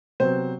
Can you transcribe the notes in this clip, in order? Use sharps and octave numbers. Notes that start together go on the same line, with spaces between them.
C3 F#3 B3 C5